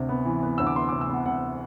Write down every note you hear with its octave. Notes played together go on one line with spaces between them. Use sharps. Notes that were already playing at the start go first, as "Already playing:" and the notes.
Already playing: D2 C3
B3
E3
B3
D2 E6
D6
B3 C6
C3 D6
E6
B3 F#5
C3 F#5